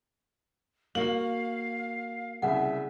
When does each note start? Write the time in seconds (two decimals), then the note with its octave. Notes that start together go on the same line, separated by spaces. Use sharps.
0.95 A#3 F#4 F5 F#7
2.42 C2 C#3 E5 F#5